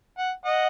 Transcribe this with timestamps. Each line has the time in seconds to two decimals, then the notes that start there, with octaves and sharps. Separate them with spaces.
0.18 F#5
0.45 D#5 F#5